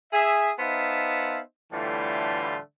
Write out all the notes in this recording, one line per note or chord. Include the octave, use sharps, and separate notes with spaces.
G#4 E5
B3 D#4 C5 E5 F5 A5
A2 D3 E3 G3 A3 F4